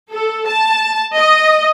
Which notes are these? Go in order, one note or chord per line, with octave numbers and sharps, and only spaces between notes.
A4
A5
D#5